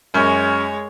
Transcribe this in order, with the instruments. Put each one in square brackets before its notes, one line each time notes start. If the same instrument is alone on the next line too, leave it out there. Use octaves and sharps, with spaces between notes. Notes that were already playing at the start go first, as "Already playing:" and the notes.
[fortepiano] F#2 [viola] G#3 C#5